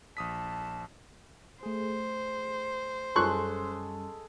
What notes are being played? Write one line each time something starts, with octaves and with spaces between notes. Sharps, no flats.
A#1 A5 D#6 B6
A3 G#4 C5
F#2 G3 G#3 C#4 A4 C6 C#6 F#6